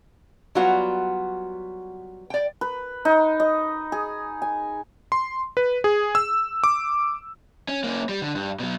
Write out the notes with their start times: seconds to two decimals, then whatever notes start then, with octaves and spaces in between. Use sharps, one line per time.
0.55 F#3 G3 B3 F4 F#4
2.30 D5 G5
2.61 B4
3.05 D#4
3.40 D#5
3.92 G#4
4.42 G#5
5.12 C6
5.57 B4
5.84 G#4
6.15 E6
6.64 D6
7.68 C#4
7.84 A#3 C#4
8.09 G3
8.22 D3
8.35 G2
8.59 B2 F#3